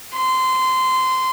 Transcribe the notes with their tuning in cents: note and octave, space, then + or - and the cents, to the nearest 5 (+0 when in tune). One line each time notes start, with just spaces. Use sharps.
C6 -20